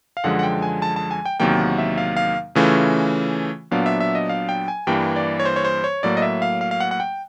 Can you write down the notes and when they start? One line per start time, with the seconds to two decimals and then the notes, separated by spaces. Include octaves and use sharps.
0.17 F5
0.24 F#2 D3 F3 G#3 F#5
0.39 F#5
0.43 G5
0.62 G#5
0.82 A5
0.96 A5
1.11 G#5
1.25 G5
1.40 E2 C3 D#3 F#3 A#3 G5
1.59 F#5
1.78 E5
1.98 F5
2.17 F5
2.55 C#3 E3 A3 C#4 F4
3.71 A#2 F#3 B3 D4 F5
3.86 E5
4.00 E5
4.15 D#5
4.29 F5
4.49 G5
4.68 G#5
4.87 G2 E3 G3 A#3 G5
5.16 D5
5.40 C#5
5.45 C5
5.56 C#5
5.65 C5
5.84 C#5
6.03 A2 F#3 A#3 D5
6.17 D#5
6.22 E5
6.42 F5
6.61 F5
6.71 F5
6.80 F#5
6.91 F#5
7.00 G5